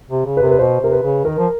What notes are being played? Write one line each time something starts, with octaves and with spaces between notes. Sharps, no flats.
C3
C#3
B4
C3 A#4
B4
B2 C5
C3 A#4
B4
C#3
D#3 A#4
F3